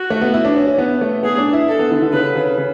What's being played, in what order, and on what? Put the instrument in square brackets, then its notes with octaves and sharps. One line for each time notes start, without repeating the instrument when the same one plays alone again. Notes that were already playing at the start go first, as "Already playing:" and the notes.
Already playing: [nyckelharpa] F#4
[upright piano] A3
B3
E4
D4
C#4
C#4
B3
A3
[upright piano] B3 [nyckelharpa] G#4
[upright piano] D4
E4
[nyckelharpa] A4
[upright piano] B3
D3
D3
[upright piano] C#3 [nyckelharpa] B4
[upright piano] C#3
C#3